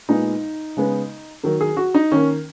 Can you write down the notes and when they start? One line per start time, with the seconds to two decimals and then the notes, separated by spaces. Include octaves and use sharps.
0.09 A#2 G#3 B3 D#4
0.77 C#3 G#3 B3
1.43 D#3 F#3 A#3
1.61 G#4
1.77 F#4
1.94 D#4
2.12 D#3 A#3 C#4